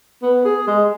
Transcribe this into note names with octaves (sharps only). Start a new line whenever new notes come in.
B3
G#4
G#3